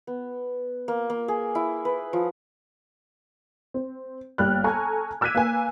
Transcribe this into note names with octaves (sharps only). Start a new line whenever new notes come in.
B3
A#3
A#3
G#4
E4
B4
F3
C4
G1 G3 A#3 G5 F6 F#6
A4 G#5 A#5 C#6 G#6
D6 E6 F#6 G#6 B6 D#7
A#3 B4 G#5